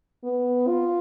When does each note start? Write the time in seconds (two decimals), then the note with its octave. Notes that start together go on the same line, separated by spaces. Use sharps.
0.24 B3
0.67 F4